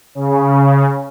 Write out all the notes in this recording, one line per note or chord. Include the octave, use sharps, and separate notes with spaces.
C#3